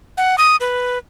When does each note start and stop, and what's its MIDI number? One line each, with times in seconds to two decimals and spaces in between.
0.18 0.36 78
0.38 0.56 87
0.60 0.98 71